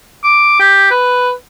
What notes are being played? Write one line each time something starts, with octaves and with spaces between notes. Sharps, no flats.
D6
G4
B4